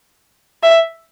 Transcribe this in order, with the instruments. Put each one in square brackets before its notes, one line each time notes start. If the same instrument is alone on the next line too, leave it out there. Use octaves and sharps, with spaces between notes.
[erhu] E5